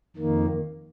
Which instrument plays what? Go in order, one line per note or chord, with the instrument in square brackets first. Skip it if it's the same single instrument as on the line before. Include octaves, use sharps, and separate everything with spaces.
[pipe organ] F2 D#3 A#3